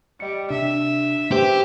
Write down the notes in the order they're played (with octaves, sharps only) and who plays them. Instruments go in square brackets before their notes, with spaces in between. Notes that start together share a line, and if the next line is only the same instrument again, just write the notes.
[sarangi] G3 [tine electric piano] D#5 C#7
[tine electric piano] C3 D4 [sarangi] E5
[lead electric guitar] G4 [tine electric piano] B4 C5